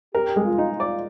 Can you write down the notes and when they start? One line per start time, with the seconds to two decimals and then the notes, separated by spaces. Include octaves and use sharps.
0.15 G4 A#4
0.36 G#3
0.44 F4
0.58 D#4
0.72 F4
0.80 D5